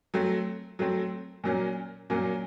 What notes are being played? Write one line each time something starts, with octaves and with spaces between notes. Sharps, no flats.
F#3 A3 C4
F#3 A3 C4
A#2 F#3 A#3 C#4
A#2 F#3 A#3 C#4